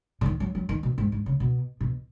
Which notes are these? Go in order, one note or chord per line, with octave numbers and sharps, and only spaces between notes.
C#3
D#3
F#3
F#3
D#3
B2
G#2
G#2
C#3
B2
B2